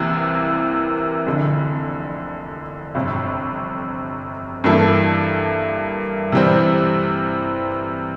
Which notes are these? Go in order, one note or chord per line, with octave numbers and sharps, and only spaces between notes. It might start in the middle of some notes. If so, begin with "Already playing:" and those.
Already playing: C2 C3 E3 A#3 E4
F1 F2 D3
G1 F2 C3
G2 E3 A#3 E4 A4
C3 E3 G3 C4